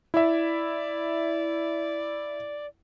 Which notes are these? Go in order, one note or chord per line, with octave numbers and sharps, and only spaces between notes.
E4 D5 E5